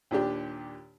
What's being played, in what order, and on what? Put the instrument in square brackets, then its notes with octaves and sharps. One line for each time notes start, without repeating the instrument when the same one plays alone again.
[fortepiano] D#2 A#2 D4 G4